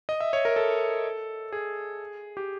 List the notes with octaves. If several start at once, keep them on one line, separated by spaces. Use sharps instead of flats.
D#5
E5
C#5
A#4
A4
G#4
G4